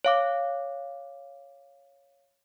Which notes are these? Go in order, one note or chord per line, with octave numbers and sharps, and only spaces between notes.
C#5 F5 D6